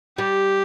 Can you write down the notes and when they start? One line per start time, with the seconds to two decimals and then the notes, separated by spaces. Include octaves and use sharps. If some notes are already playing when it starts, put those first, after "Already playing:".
0.18 G3 G4